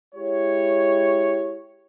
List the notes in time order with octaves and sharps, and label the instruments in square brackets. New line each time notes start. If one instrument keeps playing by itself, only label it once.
[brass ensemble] G#3 E4 G4 C#5